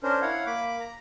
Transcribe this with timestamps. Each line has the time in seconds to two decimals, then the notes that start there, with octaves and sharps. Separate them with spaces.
0.03 C#4 D4 A#4 C5
0.22 E4 C#5 F5 F#5
0.47 A#3 B5 D6
0.80 A#5